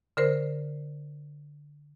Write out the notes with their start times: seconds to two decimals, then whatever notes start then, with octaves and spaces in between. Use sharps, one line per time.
0.17 D3 A#4 C5